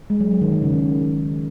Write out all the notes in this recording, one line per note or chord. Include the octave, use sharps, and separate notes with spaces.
G#3
F#3
F#3
D#3
D#3
C#3
D#3